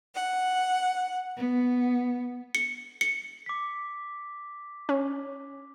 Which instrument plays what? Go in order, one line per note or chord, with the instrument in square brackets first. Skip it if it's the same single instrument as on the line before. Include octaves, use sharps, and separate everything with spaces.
[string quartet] F#5
B3
[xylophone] C#7
C#7
[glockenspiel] D6 B6
[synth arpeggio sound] C#4